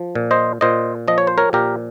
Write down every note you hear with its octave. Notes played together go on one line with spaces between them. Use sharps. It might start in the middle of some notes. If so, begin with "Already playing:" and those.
Already playing: F3
A#2
C5 D#5
A#2 C5 D#5
F3 D#5
C#5
C5
A#4 C#5
A#2 G4 A#4